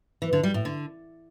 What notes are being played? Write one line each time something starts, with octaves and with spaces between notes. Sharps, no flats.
E3
D3
G3
A2
D3